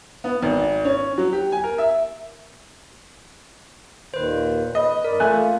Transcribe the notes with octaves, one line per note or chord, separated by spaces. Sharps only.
B3
G#1
C#4
F#3
G4
G#5
A#4
E5
D#2 A#2 D#3 B4 C5
B4 D#5
G2 A#4 D5
A3 A#3 F4 G#5 F#6